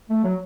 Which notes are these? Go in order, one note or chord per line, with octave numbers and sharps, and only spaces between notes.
A3
F#3